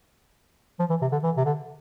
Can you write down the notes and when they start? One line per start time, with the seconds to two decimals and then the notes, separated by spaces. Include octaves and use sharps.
0.79 F3
0.90 E3
1.02 C3
1.12 D3
1.23 E3
1.37 C3
1.45 D3